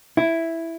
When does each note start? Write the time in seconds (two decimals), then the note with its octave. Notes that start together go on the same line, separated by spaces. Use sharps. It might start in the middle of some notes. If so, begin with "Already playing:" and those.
0.17 E4